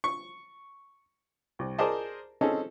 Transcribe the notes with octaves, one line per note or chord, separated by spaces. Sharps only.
C#6
C2
G#4 A#4 C5 D5 D#5 A5
C4 C#4 D#4 G#4 A4